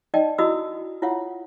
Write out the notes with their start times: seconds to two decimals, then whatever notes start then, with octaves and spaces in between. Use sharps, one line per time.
0.14 D#4 D5 D#5 G5 A5
0.38 E4 F#4 D#5 B5 D#6 E6
1.02 E4 F4 C#5 E5 F#5